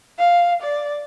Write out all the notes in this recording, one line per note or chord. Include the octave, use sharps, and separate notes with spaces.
F5
D5